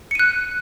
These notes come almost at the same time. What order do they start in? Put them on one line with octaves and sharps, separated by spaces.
C#7 D#7 F#6